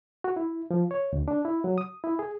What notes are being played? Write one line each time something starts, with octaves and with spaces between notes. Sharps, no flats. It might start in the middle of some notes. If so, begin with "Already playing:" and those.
F#4
E4
F3
C#5
D2
D4
E4
F#3
D#6
E4
G#4